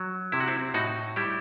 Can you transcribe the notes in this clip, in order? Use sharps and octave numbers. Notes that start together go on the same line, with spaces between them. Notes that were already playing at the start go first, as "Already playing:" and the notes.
Already playing: F#3
C3 E4
F#4
C4 E4
A2 D#4 F#4
G3 E4 G4